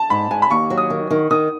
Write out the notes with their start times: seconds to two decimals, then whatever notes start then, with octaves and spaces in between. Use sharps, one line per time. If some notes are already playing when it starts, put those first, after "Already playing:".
Already playing: A5
0.10 G#2 B5
0.31 G#2 G#5
0.42 B5
0.50 D#2 C#6
0.70 F#3
0.78 D#6
0.90 D#3
1.10 D#3
1.31 D#3 D#6